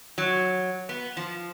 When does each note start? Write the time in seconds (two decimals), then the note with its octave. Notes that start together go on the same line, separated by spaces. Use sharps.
0.18 F#3
0.89 B3
1.17 F3